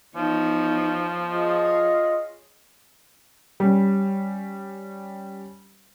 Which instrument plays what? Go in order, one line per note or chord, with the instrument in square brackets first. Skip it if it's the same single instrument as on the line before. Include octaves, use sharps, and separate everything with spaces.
[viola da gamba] E2 B3 C#5 [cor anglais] F3 [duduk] D#4
[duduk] F4 [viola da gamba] G#4 C#5 [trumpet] D#5
[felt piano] G3 C#4